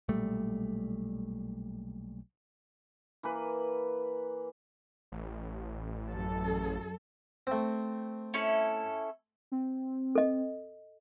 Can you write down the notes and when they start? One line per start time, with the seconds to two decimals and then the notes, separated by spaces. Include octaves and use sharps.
0.09 B1 A#2 G3 A3
3.23 E3 A#3 B4
5.12 A1
6.10 F#2 A4
7.47 A3 C4
8.34 C#4 E4 A4
9.52 C4
10.15 A4 D#5